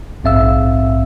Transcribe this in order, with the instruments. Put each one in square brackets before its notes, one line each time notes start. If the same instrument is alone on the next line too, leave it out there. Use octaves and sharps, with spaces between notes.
[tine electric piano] A#1 G#2 C4 E5 F5 E6